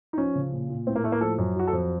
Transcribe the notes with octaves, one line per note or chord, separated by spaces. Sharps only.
D#4
F3 C#4
C#3
A#2
A#2
A2 C4
A#3
A2 A3
A#3
F3 A4
F#2
F#3 F#4
A4
F2